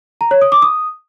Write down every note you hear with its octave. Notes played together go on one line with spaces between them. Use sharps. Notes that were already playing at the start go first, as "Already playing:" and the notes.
A#5
C#5
D#6
D6
D#6